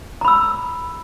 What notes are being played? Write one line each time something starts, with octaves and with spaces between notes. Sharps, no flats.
A#5 B5 E6